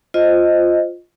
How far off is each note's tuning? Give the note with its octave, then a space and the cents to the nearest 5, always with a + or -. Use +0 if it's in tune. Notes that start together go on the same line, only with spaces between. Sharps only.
F4 +0 C5 +0 D#5 +0